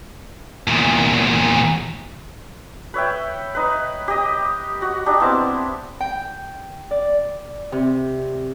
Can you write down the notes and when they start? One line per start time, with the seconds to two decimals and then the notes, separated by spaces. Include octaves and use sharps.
0.68 E2 A#2
2.94 B4 C#5 E5 G5
3.55 D#4 B4
4.08 G4 D#5
4.82 F#4
5.06 D4 D#4 G4
5.20 B3 C4 E4 A5
6.01 G5
6.91 D5
7.72 C3